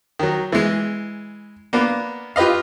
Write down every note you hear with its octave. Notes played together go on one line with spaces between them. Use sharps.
D#3 F#3
E3 G#3
A#3 B3 D4
F4 G4 B4 D#5 F5